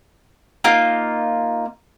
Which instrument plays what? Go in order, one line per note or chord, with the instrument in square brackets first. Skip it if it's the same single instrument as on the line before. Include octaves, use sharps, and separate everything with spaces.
[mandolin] A#3 D#4 F4